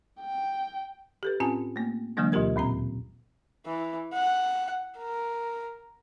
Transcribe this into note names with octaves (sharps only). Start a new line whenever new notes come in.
G5
G4 A4 B4
A2 C4 C#4 F4 G#5 A5
A3 A#3
D3 E3 F#3 G#3 A#3 D4
D2 B2 F4 G4 A#4 G#6
D#2 A#2 C4 A#5
E3
F#5
A#4